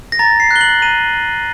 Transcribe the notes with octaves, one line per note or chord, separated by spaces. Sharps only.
A#6
A#5 A6
C7
F#6
G7
F#7
A#5 D#7